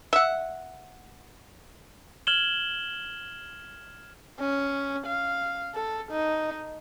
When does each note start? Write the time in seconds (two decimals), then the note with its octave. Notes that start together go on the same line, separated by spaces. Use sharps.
0.13 E5 F#5
2.27 F6 G#6 E7 F#7 G7
4.39 C#4
5.06 F5
5.75 A4
6.11 D#4